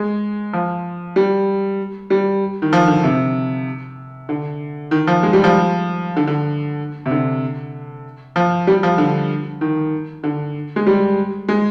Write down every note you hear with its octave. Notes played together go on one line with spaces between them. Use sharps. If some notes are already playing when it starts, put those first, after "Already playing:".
Already playing: G#3
F3
G3
G3
D#3
F3
D3
C3
D3
D#3
F3
G#3
G3
F3
D3
D3
C3
D3
F3
G3
F3
D3
D#3
D3
G#3
G3
G#3